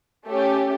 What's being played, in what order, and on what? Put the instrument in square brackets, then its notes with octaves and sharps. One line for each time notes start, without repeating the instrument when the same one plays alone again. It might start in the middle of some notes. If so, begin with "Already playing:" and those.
[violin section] A3 C#4 G4